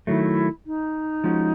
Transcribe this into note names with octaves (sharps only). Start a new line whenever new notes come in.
D#3 F#3 A3 E4
D#4
F3 G#3 C#4 F#4